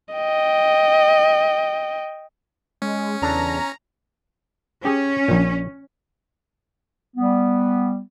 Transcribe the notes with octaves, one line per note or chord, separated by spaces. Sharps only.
D#5 G5
G#3 C#4
E2 C#3 D4 A4 A#5
C#4 G4 G#4
A#1 A#2
G3 B3